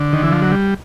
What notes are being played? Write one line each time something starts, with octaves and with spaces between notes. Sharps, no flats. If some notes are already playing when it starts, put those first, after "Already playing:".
Already playing: D3
D#3
E3
F3
F#3
G3